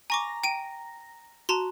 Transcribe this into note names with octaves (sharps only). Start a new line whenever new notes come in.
G#5 A#5 C#6 D6 A#6
G5 D7 D#7
F#4 A5 A#5 C6